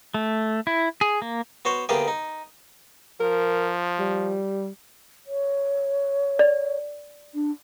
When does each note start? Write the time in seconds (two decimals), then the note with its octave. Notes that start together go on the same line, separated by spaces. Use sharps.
0.14 A3
0.67 E4
1.01 G#4
1.22 A#3
1.65 B3 F#4 C5 C#5
1.89 D2 A#3 B3 G4 G#4 D5
2.08 D#4
3.20 F3 A#4
3.99 G3
5.27 C#5
6.39 D5
7.35 D4